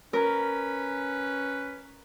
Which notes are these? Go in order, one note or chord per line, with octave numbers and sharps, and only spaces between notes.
C#4 A#4 B4